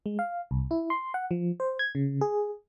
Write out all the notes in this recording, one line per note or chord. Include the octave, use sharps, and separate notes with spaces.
G#3
F5
C2
E4
C6
F#5
F3
C5
G#6
C#3
G#4